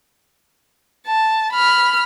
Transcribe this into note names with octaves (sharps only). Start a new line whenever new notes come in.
A5
B5 F6